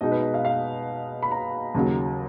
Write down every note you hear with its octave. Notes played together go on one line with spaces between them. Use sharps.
B2 G#3 D#4 D#5
B4
D#5
F5
F5
B5
A#5
D#2 C#3 F#3